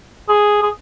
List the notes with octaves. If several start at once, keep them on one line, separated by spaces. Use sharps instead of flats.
G#4
G#4